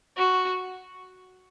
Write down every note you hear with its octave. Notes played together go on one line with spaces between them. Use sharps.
F#4